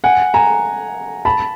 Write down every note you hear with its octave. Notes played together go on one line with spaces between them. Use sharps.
F#5 G#5
G#5 A#5
A5 B5